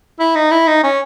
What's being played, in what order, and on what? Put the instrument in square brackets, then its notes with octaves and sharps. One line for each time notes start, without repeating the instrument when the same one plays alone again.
[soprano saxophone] E4
D#4
E4
D#4
C#4